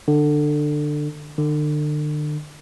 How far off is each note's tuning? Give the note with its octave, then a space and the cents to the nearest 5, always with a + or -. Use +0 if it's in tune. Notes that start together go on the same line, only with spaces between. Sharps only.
D3 +20
D3 +40